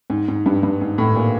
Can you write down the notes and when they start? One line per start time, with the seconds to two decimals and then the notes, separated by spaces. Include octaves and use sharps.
0.10 G#2
0.28 G#2
0.46 G2
0.63 G2
0.81 G#2
0.98 A2
1.16 A#2